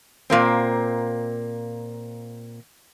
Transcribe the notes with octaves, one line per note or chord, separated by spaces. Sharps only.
A#2 A#3 C4